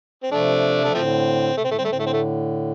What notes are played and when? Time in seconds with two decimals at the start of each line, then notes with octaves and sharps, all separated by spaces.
0.23 C4
0.32 C3 F3 A3 D4
0.84 F3 A3
0.94 A2 D3 F3 A3 C4
1.57 C3 A3
1.64 C4
1.67 A2 D3
1.71 A3
1.78 D3 G3 C4
1.85 A3
1.88 A2 D3 C4
1.99 A3
2.06 C4
2.13 A3